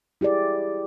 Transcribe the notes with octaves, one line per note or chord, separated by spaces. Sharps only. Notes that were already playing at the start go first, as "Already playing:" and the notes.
E4 G4 G#4 D5